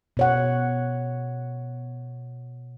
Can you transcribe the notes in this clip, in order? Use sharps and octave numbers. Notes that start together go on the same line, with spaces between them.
B2 C#5 F#5